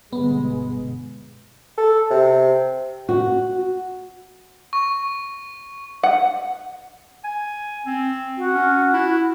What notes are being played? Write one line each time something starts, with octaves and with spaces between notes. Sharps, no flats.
G1 B2 G#3 B3
A4
C3
F#4
C#6
F#5
G#5
C4
F#4
C#4
E4